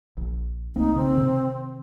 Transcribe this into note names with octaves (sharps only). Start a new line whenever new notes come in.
A#1
C2 A#3 C4 D#4
C#3 C4
C3 D#3